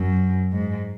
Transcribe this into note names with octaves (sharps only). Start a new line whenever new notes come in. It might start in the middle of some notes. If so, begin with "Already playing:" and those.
Already playing: F#2
G#2